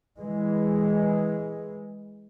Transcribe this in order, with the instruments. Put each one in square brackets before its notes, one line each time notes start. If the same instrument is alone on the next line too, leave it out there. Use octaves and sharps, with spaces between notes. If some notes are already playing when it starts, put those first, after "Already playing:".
[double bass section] E3 G#3